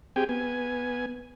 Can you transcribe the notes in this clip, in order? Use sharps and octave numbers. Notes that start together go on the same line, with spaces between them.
C4 G4 G#4 G5 G#5
B3 G#5